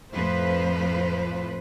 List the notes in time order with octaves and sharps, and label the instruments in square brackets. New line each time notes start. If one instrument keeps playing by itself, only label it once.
[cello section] F2 A2 F3 B4 C5